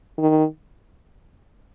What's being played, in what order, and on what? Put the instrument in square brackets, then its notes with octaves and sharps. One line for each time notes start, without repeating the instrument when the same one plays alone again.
[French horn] D#3